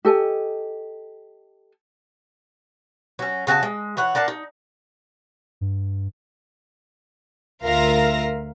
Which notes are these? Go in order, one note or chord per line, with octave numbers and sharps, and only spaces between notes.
G4 A4 D#5 G#5
F#3 C#4
C#3 F#4 G#5 A5
G#3
E3 C#5 F#5
D4 A#4 F#5 A5
D#4
G2
D2 F4 A#4 E5 F5 A#6